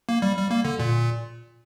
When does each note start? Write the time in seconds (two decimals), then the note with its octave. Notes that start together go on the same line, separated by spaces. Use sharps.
0.09 A#3
0.22 G3
0.37 G3
0.51 A#3
0.65 D3
0.79 A#2